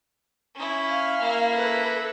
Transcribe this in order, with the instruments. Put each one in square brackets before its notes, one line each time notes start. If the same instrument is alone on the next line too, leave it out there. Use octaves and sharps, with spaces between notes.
[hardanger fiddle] C#4 E4
[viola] F5
[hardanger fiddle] A#3 E4
[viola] A4 B4